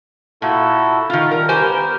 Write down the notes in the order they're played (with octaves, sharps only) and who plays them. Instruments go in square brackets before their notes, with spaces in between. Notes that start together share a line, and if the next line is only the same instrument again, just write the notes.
[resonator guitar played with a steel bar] A#2 [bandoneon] E4 F#4 A4
[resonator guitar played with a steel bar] D#3 F4
[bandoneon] G3 [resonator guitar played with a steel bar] A#4
[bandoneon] B3 A#4 [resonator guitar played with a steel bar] G4 C5 G#5